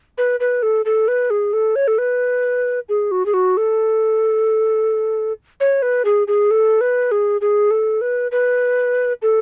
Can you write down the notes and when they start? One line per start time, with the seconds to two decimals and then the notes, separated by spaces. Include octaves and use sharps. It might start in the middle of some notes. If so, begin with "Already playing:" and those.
0.18 B4
0.40 B4
0.62 A4
0.85 A4
1.08 B4
1.30 G#4
1.53 A4
1.76 C#5
1.87 A4
1.98 B4
2.89 G#4
3.11 F#4
3.26 G#4
3.34 F#4
3.57 A4
5.60 C#5
5.82 B4
6.05 G#4
6.28 G#4
6.51 A4
6.81 B4
7.11 G#4
7.41 G#4
7.71 A4
8.01 B4
8.32 B4
9.22 A4